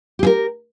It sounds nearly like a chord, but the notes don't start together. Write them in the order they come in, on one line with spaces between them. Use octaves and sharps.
G4 G#4 A#4